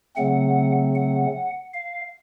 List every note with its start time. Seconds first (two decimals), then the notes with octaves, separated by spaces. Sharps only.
0.16 C#3 F#3 A3 C4 F#5
0.95 F#5
1.73 F5